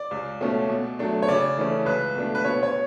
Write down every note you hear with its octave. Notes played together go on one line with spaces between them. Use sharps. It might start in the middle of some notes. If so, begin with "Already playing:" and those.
Already playing: D5
C#2
B2 A3 C#4
B2
F#3 A3 D4
C#5
C#3 D5
E3 A3 C#4
C#2 B4
B2 A3 D4
B4
B2 C#5
C#5